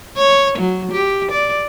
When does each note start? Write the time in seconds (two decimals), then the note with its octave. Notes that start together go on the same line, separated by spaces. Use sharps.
0.17 C#5
0.58 F#3
0.92 G4
1.31 D5